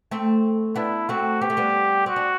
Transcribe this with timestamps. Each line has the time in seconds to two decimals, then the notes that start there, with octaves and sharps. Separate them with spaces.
0.11 A3 C4
0.76 B3 D4 E4
1.09 A3 C4 F#4
1.41 B3 G4
1.50 A3
1.57 G3 B3
2.06 C4 F#4
2.16 D4